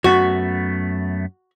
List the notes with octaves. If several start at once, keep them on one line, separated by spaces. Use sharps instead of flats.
F#2 A3 B3 F#4